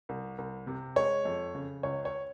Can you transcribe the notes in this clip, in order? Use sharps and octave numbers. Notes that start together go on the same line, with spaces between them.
C2
C2
C3
G#3 C#5
F2
C#3
C#2 C#5
C#5